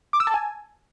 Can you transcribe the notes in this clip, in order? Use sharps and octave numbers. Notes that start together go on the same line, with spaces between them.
D6
E6
A5
G#5